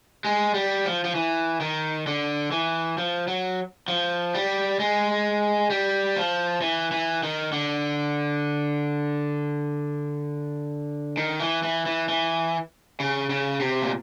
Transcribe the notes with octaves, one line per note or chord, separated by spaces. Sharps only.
G#3
G3
F3
F3
E3
D#3
D3
E3
F3
F#3
F3
G3
G#3
G3
F3
E3
E3
D#3
D3
D#3
E3
E3
E3
E3
C#3
C#3
C3
A#2